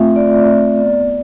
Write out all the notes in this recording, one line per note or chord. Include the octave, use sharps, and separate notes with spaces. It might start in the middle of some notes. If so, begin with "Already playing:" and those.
Already playing: A3 C4 F4 E5
A3 D5
C4 F4
B3